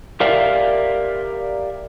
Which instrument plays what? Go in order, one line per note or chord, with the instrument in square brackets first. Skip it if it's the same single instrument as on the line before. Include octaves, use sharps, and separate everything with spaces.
[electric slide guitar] G4 A#4 D5 E5 F5